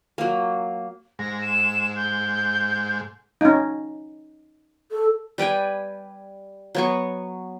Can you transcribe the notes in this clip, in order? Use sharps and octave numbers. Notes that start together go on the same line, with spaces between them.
F#3 A#3
G#2 A#6
E7
G6
C#4 D#4
A4
G3 B4 G5 G#5
F#3 B3 C#6